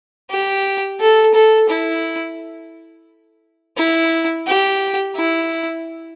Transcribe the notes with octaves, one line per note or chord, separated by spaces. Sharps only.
G4
A4
A4
E4
E4
G4
E4